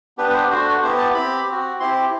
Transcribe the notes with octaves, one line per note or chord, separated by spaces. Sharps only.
B3 D4 G4 B4
B4
C5
A3 D4 F#4 C5
B3 E4 G4 C5
A5
C4 G4 B5
C4 F#4
C4 E4 G4 C6